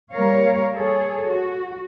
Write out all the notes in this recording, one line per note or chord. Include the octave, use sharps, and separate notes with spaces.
G3 A#3 A#4 C#5 F5
G#4 A4 C#5
F#4